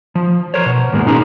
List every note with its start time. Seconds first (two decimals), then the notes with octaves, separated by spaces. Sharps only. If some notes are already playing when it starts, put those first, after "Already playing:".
0.15 F3
0.54 A#4 C5 C#5
0.66 B2
0.92 D#2 G#2 B2 G#3 A#3 A#4
1.06 C#4 D#4 G#4 A#4